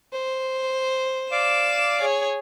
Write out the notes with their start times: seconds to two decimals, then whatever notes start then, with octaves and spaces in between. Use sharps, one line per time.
0.12 C5
1.32 D5 F5 D6 E7
2.01 G#4 C#5